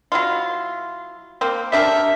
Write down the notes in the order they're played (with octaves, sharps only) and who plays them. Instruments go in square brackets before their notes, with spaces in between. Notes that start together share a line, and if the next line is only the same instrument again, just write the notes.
[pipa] F#3 E4 F4
A#3 C4
[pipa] G3 D4 A#4 [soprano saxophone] E5